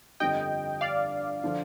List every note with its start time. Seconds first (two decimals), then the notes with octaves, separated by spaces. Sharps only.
0.20 G1 F2 D3 G3 D#5 G5
0.81 D5 F5
1.44 D3 F3